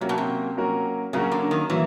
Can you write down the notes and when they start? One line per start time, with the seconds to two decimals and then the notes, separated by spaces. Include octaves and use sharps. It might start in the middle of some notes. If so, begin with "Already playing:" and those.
0.01 C3 F#3 A#3 C#4 F#4 A#4
0.09 B2
0.18 C3
0.57 F#3 A#3 C#4 F#4 A#4
1.13 C#3 F#3 A#3 C#4 F#4 A#4
1.32 D3
1.51 D#3
1.70 E3 F#3 A#3